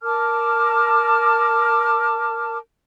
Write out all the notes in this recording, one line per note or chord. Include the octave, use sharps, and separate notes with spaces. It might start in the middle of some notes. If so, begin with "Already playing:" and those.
A#4 A5 D6 F6